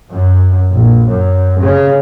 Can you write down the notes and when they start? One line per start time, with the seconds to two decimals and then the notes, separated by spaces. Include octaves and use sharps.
0.11 F#2
0.72 A#1
1.08 F#2
1.59 C#3